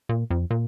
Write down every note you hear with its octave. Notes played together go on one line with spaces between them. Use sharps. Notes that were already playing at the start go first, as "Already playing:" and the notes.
A#2
F2
A#2